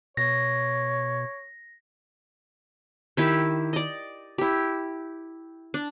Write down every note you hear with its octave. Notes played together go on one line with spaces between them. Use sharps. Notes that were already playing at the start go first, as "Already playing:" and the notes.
B2 C#5 A#6
D#3 E4 G4
D5 D#5
E4 G4
D4